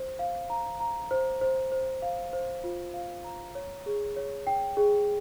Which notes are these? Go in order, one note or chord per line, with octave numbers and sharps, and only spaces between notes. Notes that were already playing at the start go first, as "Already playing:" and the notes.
Already playing: C5
F5
A#5
A#5
C5
C5
C5
F5
C5
F4
F5
A#5
C#5
G#4
C#5
G5
G#4